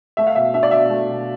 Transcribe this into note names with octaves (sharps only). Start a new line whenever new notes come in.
A3 E5
F5
B2 E5
D4 E5
D5
B2 E5
A3
B2